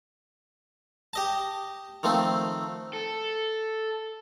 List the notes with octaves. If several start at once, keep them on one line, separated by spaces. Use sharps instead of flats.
G4 D#5 A5
D#3 F3 A3 C4
A4